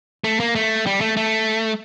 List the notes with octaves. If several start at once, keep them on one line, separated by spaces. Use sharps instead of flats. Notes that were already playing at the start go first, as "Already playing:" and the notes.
A3
A#3
A3
G3
A3
A3